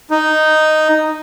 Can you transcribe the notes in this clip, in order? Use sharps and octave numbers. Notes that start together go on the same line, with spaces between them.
D#4